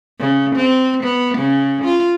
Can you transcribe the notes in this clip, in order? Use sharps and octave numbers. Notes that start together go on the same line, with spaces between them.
C#3
C4
B3
C#3
F4